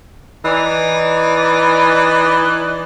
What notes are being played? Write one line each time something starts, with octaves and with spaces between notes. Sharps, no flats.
E3 D#4 D5